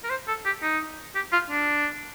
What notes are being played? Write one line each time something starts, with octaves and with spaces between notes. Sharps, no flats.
A#4
C5
A4
G4
D#4
G4
F4
D4